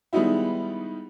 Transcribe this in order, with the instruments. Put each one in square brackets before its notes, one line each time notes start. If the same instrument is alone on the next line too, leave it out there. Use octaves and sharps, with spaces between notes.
[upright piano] D#3 G3 G#3 B3 D#4 E4